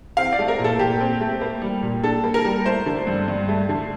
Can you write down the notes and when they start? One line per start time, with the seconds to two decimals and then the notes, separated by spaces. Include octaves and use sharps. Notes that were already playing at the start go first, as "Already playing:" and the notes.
0.17 C4 F5
0.33 D5
0.39 A3
0.48 A#4
0.59 A#2
0.64 A4
0.79 A#2 G4
1.00 C4
1.20 A3
1.42 A#3
1.62 G3
1.83 A#2
2.03 D4 A4
2.24 A#3
2.34 A#4
2.45 G3
2.65 A3 C5
2.86 D3
3.07 G2
3.28 G2
3.48 A3
3.69 D3